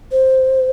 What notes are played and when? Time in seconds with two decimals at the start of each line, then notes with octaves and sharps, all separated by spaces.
0.12 C5